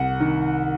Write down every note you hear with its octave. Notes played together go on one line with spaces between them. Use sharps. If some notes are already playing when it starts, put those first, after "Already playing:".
Already playing: C2 F#5
D#3